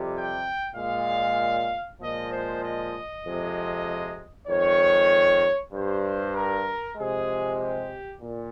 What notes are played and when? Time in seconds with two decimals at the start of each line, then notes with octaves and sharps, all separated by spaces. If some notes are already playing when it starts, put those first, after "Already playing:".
Already playing: F2 C3 G3
0.14 G5
0.76 A#2 G#3 F5
2.00 A#2 F3 G#3 D#5
2.31 C5
2.62 D#5
3.24 F2 C3 F3 G#3
4.48 F2 D#3 G#3 C#5
5.73 G2 G3 C5
6.34 A#4
6.97 C3 F3 G#3 G#4
7.59 G4
8.21 A#2